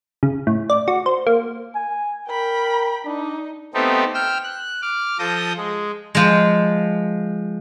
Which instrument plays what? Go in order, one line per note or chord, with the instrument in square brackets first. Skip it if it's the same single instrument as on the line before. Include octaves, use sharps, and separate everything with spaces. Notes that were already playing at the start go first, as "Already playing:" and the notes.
[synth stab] C#3
A2
D5
F#4
C5
A#3
[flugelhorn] G#5
[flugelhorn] A#4 [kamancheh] G5 B5
[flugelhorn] D4 [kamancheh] D#4
[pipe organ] A3 B3 C4 D#4 G4 A4
G5 E6 F6
F#6
D6 F6
F3 A4 D#6 G6 A#6
G#3
[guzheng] F3 G#3